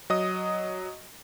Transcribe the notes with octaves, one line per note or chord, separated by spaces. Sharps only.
F#3 D#5 D#6